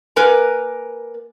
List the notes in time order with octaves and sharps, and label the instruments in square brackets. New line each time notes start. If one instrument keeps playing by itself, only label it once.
[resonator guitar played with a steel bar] A#3 A#4 B4 G#5 A#5